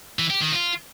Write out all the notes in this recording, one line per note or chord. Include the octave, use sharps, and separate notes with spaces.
E3
G4
D#3
F4